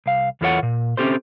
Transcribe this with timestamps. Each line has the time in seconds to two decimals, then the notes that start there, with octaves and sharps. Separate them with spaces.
0.06 C2 F5
0.41 E2 E3 F4 A4 C#5 F#5
0.63 A#2
0.97 C4 C#4 G4 A4 C5